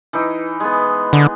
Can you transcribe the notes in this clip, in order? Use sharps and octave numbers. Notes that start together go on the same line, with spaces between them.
E3 D#4
G#3 B3
D3